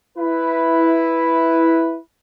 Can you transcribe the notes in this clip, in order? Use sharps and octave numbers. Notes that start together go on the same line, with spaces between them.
E4 B4